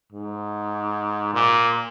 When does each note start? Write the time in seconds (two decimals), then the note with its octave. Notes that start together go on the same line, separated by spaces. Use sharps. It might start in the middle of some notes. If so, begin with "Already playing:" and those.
0.12 G#2
1.34 A#2